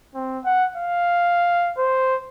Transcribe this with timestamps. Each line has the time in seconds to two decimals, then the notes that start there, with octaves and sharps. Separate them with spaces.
0.15 C4
0.45 F#5
0.76 F5
1.78 C5